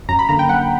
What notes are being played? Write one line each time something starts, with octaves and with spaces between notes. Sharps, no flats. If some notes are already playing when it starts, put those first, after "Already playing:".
F#2 A#5
B5
D3 A#3 A#5
G5
F#2 F#5